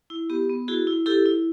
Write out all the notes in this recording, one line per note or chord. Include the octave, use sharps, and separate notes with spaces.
E4
B3 G4
B3
E4 F#4 G#4
E4
E4 G4 A4
E4